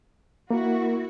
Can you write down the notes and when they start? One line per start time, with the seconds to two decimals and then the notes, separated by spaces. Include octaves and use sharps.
0.51 A#3 E4 F#4 A#4